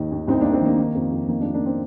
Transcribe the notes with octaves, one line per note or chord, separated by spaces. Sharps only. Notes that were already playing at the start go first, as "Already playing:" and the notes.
Already playing: D#2 D#3 D#4
D#2
C2 C4 D#4
C2 A#3 D4
C4
D#3 A#3
D#3
F2
F2
D#3 A#3
A#3 D4
F2
A#3 D4
C4